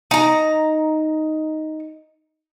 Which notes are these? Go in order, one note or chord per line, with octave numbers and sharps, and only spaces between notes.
D#4 A#5